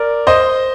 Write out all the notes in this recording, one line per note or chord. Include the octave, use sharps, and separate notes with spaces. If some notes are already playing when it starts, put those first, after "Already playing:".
Already playing: A#4 D5
C5 D#5